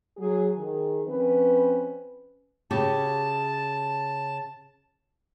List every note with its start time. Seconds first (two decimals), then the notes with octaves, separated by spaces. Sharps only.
0.18 F#3 G#4
0.57 D#3 G#4
1.06 F3 C4 C#4 B4
2.71 C#3 F#4 G4 A5